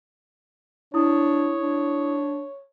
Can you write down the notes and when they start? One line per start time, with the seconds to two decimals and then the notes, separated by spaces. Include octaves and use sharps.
0.94 D4 E4 C#5 D#6
1.62 D4